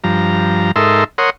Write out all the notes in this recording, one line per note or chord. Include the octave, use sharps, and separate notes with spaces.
G2 F3 A#5
G#2 D#4 A4 A#4 E5 C6
A#4 C#5 F#5 C6 D#6